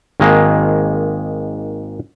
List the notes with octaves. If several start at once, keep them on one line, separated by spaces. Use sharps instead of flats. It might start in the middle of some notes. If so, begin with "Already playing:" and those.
G#1 D#3 G#3 A#3